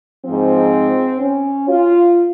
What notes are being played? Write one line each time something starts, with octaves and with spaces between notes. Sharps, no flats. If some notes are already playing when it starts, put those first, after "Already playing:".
G#2 F3 C4
C#4
F4